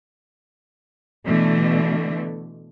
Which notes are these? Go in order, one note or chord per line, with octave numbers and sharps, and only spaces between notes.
B2 D3 E3 A3